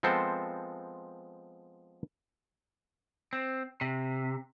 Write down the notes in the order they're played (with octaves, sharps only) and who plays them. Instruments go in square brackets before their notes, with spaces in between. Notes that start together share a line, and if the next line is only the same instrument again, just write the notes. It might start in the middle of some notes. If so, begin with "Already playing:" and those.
[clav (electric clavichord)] F3 G#3 B3 C4 A4 C5
[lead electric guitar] C4
C3